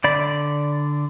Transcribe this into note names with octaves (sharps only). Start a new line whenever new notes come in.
D3 D5 B5